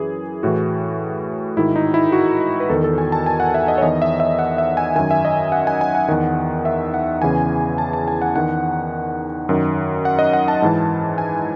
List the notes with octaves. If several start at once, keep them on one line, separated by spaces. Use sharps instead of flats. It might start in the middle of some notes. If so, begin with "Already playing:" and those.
Already playing: F#2 E3 G#4
A2 E3 F#4
G#2 D#3 E4
D#4
E4
F#4
B4
E2 D#3 A4
A4
G#5
A5
G#5
F#5
E5
D#5
C#5
E2 D#3 D#5
E5
E5
F#5
E5
G#5
F#2 D#3 G#5
E5
D#5
F#5
G#5
G#5
F#5
E2 D#3
E5
F#5
E2 C#3 E3 G#5
A5
A5
G#5
F#5
E2 D#3 F#5
F#2 D#3
F#5
D#5
F#5
A5
G#2 E3
G#5